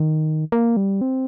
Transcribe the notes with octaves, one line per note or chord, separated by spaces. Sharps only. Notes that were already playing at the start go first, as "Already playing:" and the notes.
Already playing: D#3
A#3
G3
C4